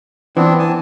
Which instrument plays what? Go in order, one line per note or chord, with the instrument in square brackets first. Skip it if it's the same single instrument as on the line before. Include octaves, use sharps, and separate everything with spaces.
[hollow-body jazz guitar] E3 [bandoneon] B3 C4 D4
[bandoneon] G#5 A5